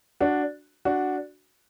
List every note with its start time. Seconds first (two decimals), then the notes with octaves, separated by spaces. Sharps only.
0.20 D4 F#4
0.85 D4 F#4